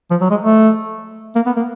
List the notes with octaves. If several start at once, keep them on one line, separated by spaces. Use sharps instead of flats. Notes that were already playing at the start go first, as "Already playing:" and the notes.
F3
F#3
G#3
A3
A#3
B3
A#3